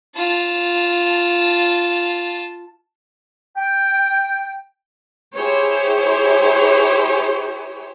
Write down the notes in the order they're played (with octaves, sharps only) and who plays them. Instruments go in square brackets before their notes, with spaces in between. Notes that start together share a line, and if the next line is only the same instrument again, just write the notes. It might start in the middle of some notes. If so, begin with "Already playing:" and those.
[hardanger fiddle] F4 A5
[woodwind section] G5
[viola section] E4 G4 G#4 C5 C#5